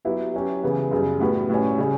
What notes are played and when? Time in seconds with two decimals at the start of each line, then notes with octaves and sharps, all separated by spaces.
0.05 F#3 B3 E4 G4
0.34 F#3 C#4 G4
0.63 C#3 E3 B3 E4
0.91 F#2 C#3 G3 B3
1.20 A2 G3 B3 F#4 B4
1.50 A2 G3 C#4
1.78 C#3 G3 C#4